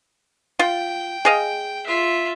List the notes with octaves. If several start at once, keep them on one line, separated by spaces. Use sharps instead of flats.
F4 G5
G#4 D#5 F5
F4 E5